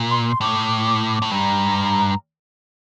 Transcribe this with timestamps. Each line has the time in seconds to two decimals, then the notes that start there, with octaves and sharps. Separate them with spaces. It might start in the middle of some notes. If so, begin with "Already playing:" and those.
Already playing: A#2
0.11 C6
0.41 A2 D6
1.22 A2
1.31 G2 A#5